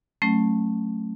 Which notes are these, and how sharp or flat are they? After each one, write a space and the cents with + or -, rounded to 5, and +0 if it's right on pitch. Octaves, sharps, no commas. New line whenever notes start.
F#3 +0 A3 +0 C#4 -20